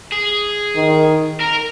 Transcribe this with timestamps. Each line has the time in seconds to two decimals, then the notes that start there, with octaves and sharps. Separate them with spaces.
0.12 G#4
0.76 D#3
1.40 A#4